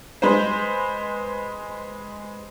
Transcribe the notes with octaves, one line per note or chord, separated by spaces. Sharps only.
G#3 B4 C5